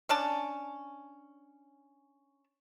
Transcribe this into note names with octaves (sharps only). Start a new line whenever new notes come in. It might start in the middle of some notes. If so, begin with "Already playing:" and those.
C#4 D4 A5